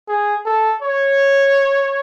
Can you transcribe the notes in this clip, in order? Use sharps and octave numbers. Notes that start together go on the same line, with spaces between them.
G#4
A4
C#5